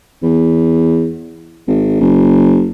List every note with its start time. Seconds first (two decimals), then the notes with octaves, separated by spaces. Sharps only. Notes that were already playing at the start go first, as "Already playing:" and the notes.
0.23 E2
1.67 G#1
2.00 F#1